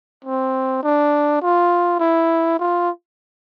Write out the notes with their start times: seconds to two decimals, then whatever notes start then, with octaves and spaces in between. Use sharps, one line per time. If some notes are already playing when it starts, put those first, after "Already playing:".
0.25 C4
0.83 D4
1.42 F4
2.00 E4
2.59 F4